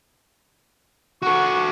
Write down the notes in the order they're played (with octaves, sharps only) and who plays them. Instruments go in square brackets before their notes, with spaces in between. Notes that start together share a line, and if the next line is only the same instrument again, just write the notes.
[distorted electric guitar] F#4 A4 [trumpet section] F#5 C#6